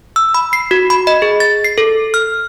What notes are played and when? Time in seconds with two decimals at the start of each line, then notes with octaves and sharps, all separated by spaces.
0.16 E6
0.34 B5
0.53 C7
0.71 F#4
0.90 B5
1.07 D#5
1.22 G#4
1.40 A6
1.64 C7
1.78 A4
2.14 F6